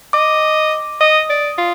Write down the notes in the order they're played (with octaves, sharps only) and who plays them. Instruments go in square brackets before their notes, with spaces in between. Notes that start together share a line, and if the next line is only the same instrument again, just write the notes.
[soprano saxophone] D#5 [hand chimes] D6
[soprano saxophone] D#5 [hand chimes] D#6
[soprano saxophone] D5
F4